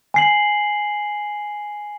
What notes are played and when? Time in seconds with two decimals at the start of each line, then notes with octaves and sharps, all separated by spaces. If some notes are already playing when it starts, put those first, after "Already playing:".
0.14 G#5 C7 F#7